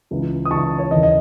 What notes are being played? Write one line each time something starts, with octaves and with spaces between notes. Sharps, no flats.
C#2 C#3 E3
D#6
C#2 C#3 E3 A5 C#6
C#5
D#2 C#3 E3 D#5
D#5